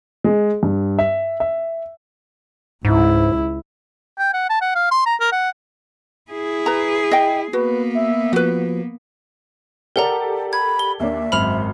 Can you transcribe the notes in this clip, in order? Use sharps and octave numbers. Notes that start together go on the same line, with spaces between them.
G#3
G2
E5
E5
C#2 G#2 E4
G5
F#5
A5
F#5
F5
C6
A#5
A#4
F#5
E4 G#4
B4 A#5
D#5 G5
A#3 B3 F#4 B4
E5
F3 F#4 B4
G4 A4 A#4 D5 F#5 A#5
B5 G#6
G7
D#2 A#3 D4 E5
G#1 F#2 C5 B5 F6 F7